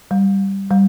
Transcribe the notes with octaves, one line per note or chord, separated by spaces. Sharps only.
G3
G3